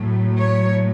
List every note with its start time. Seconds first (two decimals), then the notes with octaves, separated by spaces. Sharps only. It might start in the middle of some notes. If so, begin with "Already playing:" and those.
Already playing: A2 F#3 A3
0.38 C#5